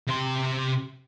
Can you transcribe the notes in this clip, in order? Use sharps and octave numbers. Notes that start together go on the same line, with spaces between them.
C3 C6